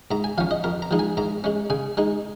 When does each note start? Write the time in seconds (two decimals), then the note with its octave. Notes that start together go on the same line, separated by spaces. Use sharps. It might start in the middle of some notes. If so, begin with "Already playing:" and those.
0.11 G#2 A#5
0.24 G#5
0.38 F3 C#4 F5
0.51 D#5
0.64 F2 A#4
0.82 A#5
0.91 F3 G#3 D#4
0.99 G#5
1.17 G#2 A#5
1.44 G#3 C#4
1.70 C#3 G#5
1.97 G#3 D#4